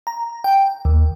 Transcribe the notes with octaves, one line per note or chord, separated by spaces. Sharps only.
A#5
G5
D#2